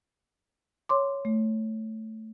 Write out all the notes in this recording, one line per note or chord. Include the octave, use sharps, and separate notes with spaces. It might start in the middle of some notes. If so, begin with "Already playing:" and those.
C#5 C6 D6
A3